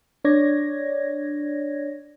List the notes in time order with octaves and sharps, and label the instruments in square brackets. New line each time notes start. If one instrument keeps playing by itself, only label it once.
[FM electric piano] D4 C#5 D5 G#6 A#6